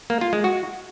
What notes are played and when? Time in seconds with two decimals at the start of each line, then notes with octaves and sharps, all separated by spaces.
0.10 A#3
0.21 F4
0.33 G#3
0.44 F#4